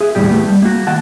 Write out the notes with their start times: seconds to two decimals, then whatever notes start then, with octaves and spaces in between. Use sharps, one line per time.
0.01 G#4 E5
0.15 D#2 A2 E3 G3 G4
0.28 A3 B3 G4
0.48 G3
0.62 A#3 F#4
0.87 D#3 F#5 A5